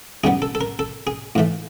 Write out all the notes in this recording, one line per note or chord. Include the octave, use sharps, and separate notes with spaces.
F#2 D3 G3 B3 G#4
A4
A4
A#4
A4
G#4
A2 E3 A3